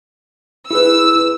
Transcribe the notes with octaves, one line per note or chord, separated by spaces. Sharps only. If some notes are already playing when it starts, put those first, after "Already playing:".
E4 G#4 B4 E6